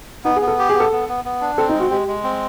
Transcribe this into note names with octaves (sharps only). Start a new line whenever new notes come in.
B3 D#4
G#4
B3
A4
G4
G#4
B3
A4
B3
B3
B3
D4
C4 A4
D#4
G#3
F#4
G#3 G4
G#3
C4